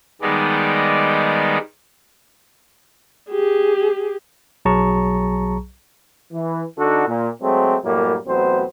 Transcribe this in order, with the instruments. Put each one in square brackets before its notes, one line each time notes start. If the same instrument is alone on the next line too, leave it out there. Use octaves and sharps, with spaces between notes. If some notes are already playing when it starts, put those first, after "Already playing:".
[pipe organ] D#3 G3 G#3 B3 D#4 D5
[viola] G4 G#4
[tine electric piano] B1 F#3 G#4 A5 A#5 C#6
[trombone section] E3
D3 D4 D#4 F#4 A4
A#2
F#3 G#3 A3 C4
F#2 A2 G3 A#3
A1 F#3 B3 C4 C5